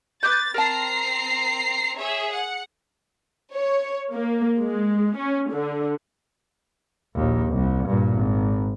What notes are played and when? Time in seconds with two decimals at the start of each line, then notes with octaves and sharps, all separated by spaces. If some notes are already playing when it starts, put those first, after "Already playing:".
0.23 B4 D6 G6 A6
0.54 C4 A#4 A5 A#5 C7
1.98 G#4 C#5 E5
2.32 F#5 C#7
3.55 C#5
4.13 A#3
4.59 G#3
5.17 C#4
5.51 D3
7.15 A#1 D#2
7.51 C2
7.86 G2 A#2
8.14 G#1